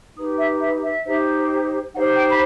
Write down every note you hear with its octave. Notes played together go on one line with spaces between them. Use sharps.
D#4 G4 B4 D#6
E5
E5
E5
D#4 G4 C5
D#4 G4 C5 F#5
G5
B5